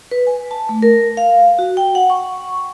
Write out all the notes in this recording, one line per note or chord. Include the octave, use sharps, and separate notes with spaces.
B4
G#5
A5
A3
A#4
F5
F#4
G5
F#5
C#6